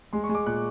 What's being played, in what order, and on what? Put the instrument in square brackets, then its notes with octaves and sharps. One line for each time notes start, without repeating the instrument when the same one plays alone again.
[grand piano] G#3 C6
C#6
G#3
D6
A#2 F#6